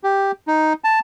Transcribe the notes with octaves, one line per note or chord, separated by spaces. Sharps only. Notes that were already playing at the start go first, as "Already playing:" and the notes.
G4
D#4
A5